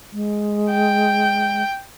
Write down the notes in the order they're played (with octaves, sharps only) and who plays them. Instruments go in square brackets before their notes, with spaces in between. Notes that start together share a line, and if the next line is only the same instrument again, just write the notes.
[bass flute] G#3
[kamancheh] G5